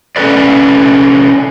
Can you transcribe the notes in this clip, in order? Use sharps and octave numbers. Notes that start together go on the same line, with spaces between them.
C3 C#4 A4 B4 D5